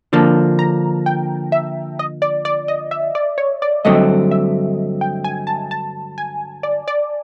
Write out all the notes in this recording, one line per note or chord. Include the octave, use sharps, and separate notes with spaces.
D3 F3 A#3 A5
A#5
G5
E5
D#5
D5
D5
D#5
E5
D5
C#5
D5
G2 D3 F#3 A3 C4 D#5
E5
G5
G#5
A5
A5
G#5
D5
D5